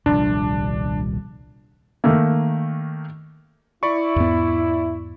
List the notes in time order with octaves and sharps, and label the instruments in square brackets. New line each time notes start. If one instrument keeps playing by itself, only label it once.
[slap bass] D#1 C2 F3 [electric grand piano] D4
[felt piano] D#3 A3 A#3
[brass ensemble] E4 [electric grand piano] D5 B5 C#6
[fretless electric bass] E2 G#2 B3